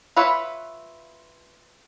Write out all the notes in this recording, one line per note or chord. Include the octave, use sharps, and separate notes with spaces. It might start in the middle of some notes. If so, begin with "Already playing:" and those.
F4 B4 C#5 E5